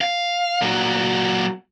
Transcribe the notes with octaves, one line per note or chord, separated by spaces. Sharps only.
F5
A#2 F#3